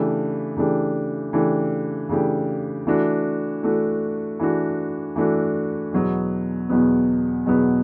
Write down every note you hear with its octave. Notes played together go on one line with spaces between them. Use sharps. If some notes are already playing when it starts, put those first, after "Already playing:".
Already playing: C#3 E3 A3 D4 G4
C#3 E3 A3 D4 G4
C#3 E3 A3 D4 G4
C#3 E3 A3 D4 G4
E3 A3 D4 F#4
E3 A3 D4 F#4
E3 A3 D4 F#4
E3 A3 D4 F#4
E2 B2 F#3 B3
E2 B2 F#3 B3
E2 B2 F#3 B3